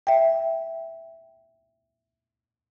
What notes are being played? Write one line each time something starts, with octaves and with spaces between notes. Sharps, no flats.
E5 G5